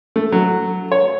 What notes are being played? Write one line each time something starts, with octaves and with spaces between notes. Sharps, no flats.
A3
F#3
C#5